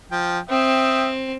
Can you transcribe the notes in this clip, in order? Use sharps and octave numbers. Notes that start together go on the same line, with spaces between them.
F3 G5
C4 E5 G5 D#6